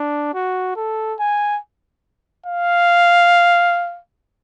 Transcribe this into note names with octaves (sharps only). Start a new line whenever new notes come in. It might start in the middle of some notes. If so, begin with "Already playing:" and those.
Already playing: D4
F#4
A4
G#5
F5